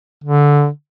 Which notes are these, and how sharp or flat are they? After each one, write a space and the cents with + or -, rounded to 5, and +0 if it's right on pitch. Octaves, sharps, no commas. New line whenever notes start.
D3 -15